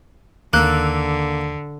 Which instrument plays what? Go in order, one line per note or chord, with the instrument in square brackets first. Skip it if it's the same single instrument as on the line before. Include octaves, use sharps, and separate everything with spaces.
[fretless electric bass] D#2 [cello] D3 [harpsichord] A#3 [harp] E6 F#6